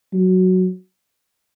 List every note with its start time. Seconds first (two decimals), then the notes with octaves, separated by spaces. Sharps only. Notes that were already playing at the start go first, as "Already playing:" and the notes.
0.14 F#3